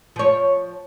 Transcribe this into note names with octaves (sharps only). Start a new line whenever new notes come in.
F3 C#5